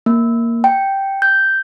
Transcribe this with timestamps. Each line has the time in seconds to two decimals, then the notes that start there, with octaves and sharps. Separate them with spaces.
0.06 A#3
0.64 G5
1.22 G6